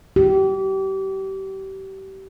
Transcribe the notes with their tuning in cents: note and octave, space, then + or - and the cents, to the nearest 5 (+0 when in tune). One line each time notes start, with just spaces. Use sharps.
G4 -30